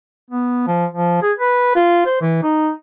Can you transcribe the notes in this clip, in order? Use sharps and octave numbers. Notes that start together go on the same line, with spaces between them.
B3
F3
F3
G#4
B4
F4
C5
E3
D#4